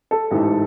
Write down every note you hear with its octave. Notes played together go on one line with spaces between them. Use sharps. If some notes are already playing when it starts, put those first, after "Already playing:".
A4
A1 G#2 E3